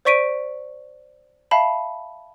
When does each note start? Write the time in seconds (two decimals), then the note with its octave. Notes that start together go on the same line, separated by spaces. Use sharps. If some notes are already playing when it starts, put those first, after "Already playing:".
0.05 C5 D5 C#6 B6 D7 D#7
1.51 E5 F5 A5 B5